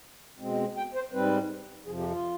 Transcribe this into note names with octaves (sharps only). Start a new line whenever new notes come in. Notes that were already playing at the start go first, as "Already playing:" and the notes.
B2 G#3 C4
G5
C5
G#2 G3 C4 B4
F2 C3 F3 G#4
G4
F4